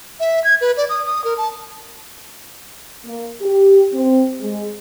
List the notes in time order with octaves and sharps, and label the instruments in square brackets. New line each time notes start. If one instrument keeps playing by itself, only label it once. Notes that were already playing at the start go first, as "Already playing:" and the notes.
[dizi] E5
G#6
B4
D5
D#6
D#6
A#4
A5
[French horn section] A#3
G4
C4
G#3